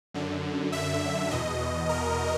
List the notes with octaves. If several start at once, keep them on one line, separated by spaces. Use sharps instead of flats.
F#2 D3
E5
E2 B2 D#5
A#4